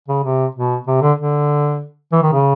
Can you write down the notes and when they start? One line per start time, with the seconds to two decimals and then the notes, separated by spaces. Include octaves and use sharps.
0.08 C#3
0.24 C3
0.55 B2
0.87 C3
1.02 D3
1.18 D3
2.12 E3
2.23 D#3
2.33 C#3